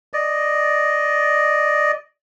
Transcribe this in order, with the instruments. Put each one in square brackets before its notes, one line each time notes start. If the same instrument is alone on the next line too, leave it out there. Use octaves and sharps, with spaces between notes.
[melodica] D5 D#5